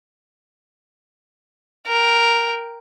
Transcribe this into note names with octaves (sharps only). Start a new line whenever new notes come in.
A#4 G5